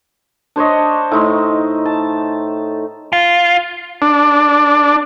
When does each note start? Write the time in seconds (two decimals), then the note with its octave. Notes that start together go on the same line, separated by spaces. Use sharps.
0.56 D4 C5 C#5 D#5
1.12 A2 D#4 C6
1.85 A5
3.13 F4
4.02 D4